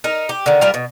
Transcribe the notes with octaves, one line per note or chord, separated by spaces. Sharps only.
D#4 A#4
G4
D3 D#3
G3 F4 A#4 F5
B2